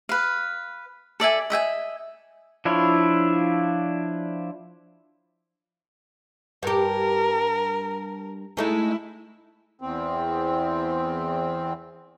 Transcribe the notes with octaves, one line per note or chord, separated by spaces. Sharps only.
B4 F5
A4 D5 E5 G#5
D#5 E5 G5 G#5
F3 D4 E4 F4 C#5
G2 G4 A#4
G#3 A3 D#4 E4
E2 C4